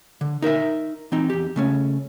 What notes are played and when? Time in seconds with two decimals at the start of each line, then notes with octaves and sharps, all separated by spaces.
0.21 D3
0.42 D#4 A#4 D#5 E5
1.12 E3 C4 D#4
1.30 E2 G4
1.56 C#3 A3 C#4